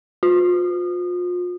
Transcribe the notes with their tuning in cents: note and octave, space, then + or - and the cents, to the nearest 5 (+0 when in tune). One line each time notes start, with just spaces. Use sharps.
F4 +35